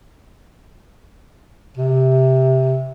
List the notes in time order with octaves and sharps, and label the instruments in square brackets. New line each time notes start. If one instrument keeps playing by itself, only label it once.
[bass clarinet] C3